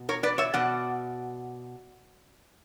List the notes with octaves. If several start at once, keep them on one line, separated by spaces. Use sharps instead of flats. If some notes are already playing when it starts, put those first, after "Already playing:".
Already playing: B2
A#4 C#5
B4 D5
C#5 E5
B2 D5 F#5